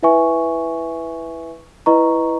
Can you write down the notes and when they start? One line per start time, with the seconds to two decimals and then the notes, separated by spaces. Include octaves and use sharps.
0.03 E4 B4 E5 G#5 C#6
1.86 E4 B4 D#5 A#5 C#6